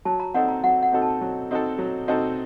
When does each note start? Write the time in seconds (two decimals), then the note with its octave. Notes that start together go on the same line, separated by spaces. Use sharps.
0.05 F#3 A5
0.20 A#5
0.34 C4 D#4 F#4 A4 F#5
0.49 A#5
0.63 F#3 F#5
0.83 F#5
0.92 C4 D#4 F#4 A4
1.02 A5
1.21 F#3
1.51 C4 D#4 F#4 A4
1.78 F#3
2.08 C4 D#4 F#4 A4